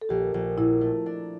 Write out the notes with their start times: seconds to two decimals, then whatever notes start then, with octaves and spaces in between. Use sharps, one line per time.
0.02 A4
0.09 A#1 G4
0.34 A#1
0.58 A#2 E4
0.81 A3
1.06 D4